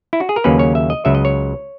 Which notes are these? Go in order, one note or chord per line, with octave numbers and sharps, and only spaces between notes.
E4
F#4
G#4
A#4
D#2 C#3 F#3 A#3 C#4 B4
C#5
E5
D#5
C#2 C#3 F#3 E5
D#5
C#5